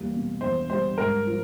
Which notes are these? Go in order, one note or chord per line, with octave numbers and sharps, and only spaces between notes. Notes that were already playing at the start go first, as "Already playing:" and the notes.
Already playing: E2 G3 A#3
B2
E2 C5
G3 C5
G#2 A#4
F3